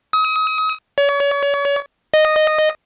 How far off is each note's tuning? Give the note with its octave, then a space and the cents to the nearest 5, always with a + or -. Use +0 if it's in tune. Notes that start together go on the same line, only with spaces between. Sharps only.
D#6 +35
C#5 +35
D#5 -10